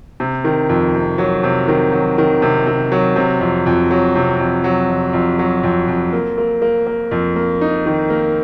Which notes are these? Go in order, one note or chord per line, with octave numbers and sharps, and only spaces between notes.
C3
D#3
F2
C3
F#3
C3
D#3
F#3
D#3
C3
C3
F#3
C3
F2
F2
F#3
C3
F2
F#3
F2
F2
F#3
F2
F2
A#3
A#3
A#3
A#3
F2
A#3
D#4
D#3
A#3